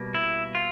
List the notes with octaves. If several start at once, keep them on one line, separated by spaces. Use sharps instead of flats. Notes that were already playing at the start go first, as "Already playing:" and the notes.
Already playing: B2 G3 A#3
E4
F4